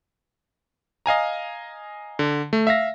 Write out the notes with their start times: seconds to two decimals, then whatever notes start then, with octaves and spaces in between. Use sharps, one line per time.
1.06 D#5 F5 G#5 A#5
2.19 D3
2.53 A3
2.67 E5 F5 A#6